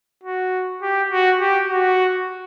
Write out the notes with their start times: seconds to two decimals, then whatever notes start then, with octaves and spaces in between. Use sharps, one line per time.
0.24 F#4
0.82 G4
1.11 F#4
1.40 G4
1.69 F#4